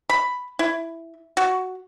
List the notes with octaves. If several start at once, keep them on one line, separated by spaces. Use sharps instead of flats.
B5
E4
F#4